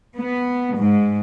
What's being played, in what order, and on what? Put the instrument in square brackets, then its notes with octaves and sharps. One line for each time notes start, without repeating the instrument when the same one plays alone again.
[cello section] B3
G#2